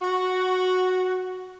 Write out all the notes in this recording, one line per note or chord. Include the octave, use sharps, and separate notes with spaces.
F#4